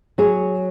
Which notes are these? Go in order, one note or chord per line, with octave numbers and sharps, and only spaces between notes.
F#3 G#4 C#5